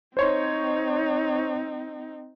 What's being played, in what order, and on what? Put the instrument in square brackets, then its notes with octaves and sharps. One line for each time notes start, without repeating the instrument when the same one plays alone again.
[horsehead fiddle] C4 D#4 [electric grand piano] C5 C#5 C6